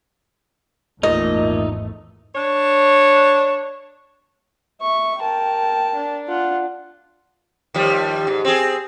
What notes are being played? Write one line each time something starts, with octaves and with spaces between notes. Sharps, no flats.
G#1 E2 A#2 A3 D#4 D#5
D4 C#5
E5 C#6
A#4 G5 A5
D4
F4 F#5
D#2 F3 G3
G#2
C4 G#4